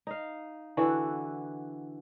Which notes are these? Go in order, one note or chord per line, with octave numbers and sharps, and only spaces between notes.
D#4 F5
D3 E3 F#4 B4